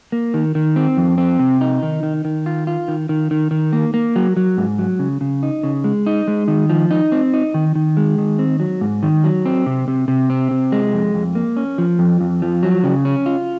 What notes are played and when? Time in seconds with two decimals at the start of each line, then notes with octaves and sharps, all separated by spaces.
0.12 A#3
0.34 D#3
0.55 D#3
0.76 C4
0.97 F2
1.18 C4
1.39 C3
1.61 D#4
1.82 D#3
2.03 D#3
2.25 D#3
2.46 F4
2.67 F4
2.88 D#3
3.09 D#3
3.31 D#3
3.51 D#3
3.73 A#3
3.94 A#3
4.16 F#3
4.37 F#3
4.58 G#2
4.79 F#3
4.99 C#3
5.21 C#3
5.43 D#4
5.63 C#3
5.84 G#3
6.06 D#4
6.27 G#3
6.48 D#3
6.70 F3
6.91 D#4
7.12 C4
7.34 D#4
7.54 D#3
7.75 D#3
7.97 G#3
8.18 D#3
8.39 C4
8.60 F#3
8.81 G#2
9.03 D#3
9.24 F#3
9.46 C4
9.66 C3
9.88 C3
10.08 C3
10.30 C4
10.51 C3
10.72 G#3
10.93 F2
11.14 F2
11.35 A#3
11.57 C#4
11.78 F3
11.99 F2
12.21 F2
12.42 F3
12.63 F#3
12.84 C#3
13.05 C#4
13.26 F4